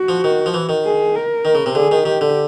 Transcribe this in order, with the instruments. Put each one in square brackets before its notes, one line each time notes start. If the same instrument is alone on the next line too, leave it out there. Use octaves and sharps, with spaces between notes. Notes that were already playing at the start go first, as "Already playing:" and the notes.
Already playing: [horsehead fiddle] F#4
[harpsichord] F3
D#3
F3
E3
D#3
[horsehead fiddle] G#4
A#4
[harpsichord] D#3
C#3
C3
[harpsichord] D3 [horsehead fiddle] G#4
[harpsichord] D#3
[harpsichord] D#3 [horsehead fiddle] G4
[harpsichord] D3